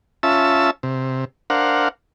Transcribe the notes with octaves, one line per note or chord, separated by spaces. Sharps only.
C#4 F4 E5 A5 E6
C3
D4 A#4 C5 F5 F#5